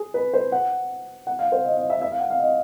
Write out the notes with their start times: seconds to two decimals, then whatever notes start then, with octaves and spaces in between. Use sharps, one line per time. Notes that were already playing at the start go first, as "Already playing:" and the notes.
Already playing: G#4
0.14 B4
0.34 C5
0.52 F#5
1.27 F#5
1.39 F5
1.52 C5
1.65 D#5
1.77 D#5
1.90 E5
2.02 E5
2.12 F5
2.20 F#5
2.30 F5
2.39 D#5